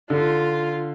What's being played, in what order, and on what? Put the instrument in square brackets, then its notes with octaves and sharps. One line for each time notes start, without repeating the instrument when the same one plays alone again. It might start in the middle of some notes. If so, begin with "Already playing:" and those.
[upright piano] D3 [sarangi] F4